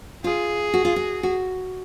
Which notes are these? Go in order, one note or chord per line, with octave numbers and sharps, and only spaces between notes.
F4 G#4
F#4
F4
F#4
F#4